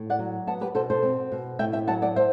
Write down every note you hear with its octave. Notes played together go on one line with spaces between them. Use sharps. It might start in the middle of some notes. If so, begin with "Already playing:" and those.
Already playing: A2
D5 F#5
F#3
B3 F#5 A5
G4 B4
B2 A4 C5
A4 C5
C4
B2
A2 E5 G5
E5 G5
F#3 F#5 A5
D5 F#5
C5 E5